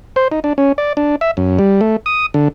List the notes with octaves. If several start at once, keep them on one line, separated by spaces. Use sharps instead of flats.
C5
D#4
D4
C#4
D5
D4
E5
F#2
G3
A3
D#6
D3